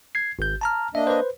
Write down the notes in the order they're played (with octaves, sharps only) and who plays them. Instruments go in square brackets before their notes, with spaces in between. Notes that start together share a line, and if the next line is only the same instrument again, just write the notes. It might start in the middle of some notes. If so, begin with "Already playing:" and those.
[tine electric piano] G#6 C7
G#1 G6
A5 A#5 F6
[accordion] A#3 D4 D#5 [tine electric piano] E5
[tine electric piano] B4 C5